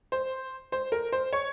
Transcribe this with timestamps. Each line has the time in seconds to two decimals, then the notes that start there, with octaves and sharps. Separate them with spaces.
0.12 C5
0.72 C5
0.92 A#4
1.12 C5
1.33 C#5